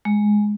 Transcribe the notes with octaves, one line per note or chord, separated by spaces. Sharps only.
G#3